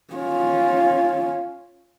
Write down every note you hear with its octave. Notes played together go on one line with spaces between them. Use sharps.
C#4 F4